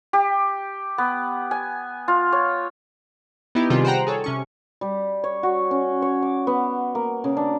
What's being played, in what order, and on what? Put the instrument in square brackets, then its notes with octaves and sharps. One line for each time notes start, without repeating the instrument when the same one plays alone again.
[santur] G4
B3
G#5
F4
C#5
[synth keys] B3 D#4 E4 G4
C3 D#3 G3 F4 G#4
C5 F#5 G5 A#5 F#6
G#4 A4 C#5
C3 C#4 C#6
[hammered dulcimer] G3
C#5
F#4
C#4
C#5
D6
B3
A#3
C#3
D4